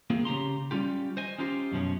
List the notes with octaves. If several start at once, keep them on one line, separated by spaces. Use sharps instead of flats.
A#3 C4 F4 G#4
C#3 G4 A#5 C6
G3 C#4 F4 G4
C5 D#5 G#5
C#4 D#4 F4 G4 C5
F#2 B2 F3 C#4